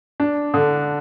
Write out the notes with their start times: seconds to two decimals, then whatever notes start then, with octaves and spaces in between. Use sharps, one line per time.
0.20 D4
0.54 D3